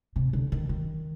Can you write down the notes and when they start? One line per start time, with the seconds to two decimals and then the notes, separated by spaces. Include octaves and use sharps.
0.16 C3
0.33 D3
0.52 D#3
0.69 D#3